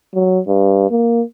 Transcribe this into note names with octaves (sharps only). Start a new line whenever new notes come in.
F#3
G2
A#3